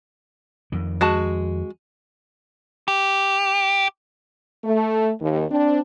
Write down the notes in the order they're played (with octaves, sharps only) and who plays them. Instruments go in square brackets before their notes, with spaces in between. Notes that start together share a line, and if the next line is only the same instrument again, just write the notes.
[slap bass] F2 D#3
[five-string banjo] G#3 F#4 A5
[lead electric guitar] G4
[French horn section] A3
D#2
C4 D4